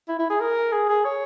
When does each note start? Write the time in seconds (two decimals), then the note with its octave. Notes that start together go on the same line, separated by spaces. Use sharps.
0.08 E4
0.19 E4
0.30 G#4
0.41 A#4
0.72 G#4
0.89 G#4
1.05 C#5